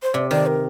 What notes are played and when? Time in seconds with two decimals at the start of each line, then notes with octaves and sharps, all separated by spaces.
0.03 C5
0.14 C3 D5
0.31 D#3 D5
0.47 A#4